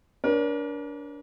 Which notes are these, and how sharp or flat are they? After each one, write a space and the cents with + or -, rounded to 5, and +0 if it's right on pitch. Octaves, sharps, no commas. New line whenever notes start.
D4 -25 A#4 +35 C#5 -35